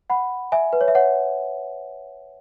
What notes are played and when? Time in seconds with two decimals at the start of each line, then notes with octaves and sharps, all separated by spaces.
0.10 F#5 B5
0.52 E5 G#5
0.73 B4
0.81 C#5
0.88 E5
0.95 C#5 F#5